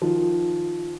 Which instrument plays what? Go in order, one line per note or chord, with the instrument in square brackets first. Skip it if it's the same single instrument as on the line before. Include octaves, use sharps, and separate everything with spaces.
[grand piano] D#3 F3